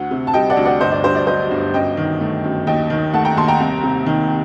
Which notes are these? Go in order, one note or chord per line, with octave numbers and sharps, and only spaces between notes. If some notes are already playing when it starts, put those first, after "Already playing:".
Already playing: D2 F#5
C3
A5
G3 D#5 G5
D5 F#5
D2
D5 F#5
G1 C5 D#5
D5
G2 C5
D5
F#3 C5 D#5
G1
F#2 D#5 G5
D#3
A3
F#2
D#2 D#5 G5
D#3
A3 F#5 A5
G5 A#5
D#2 A5 C6
G5 A#5
C2
C3
D#3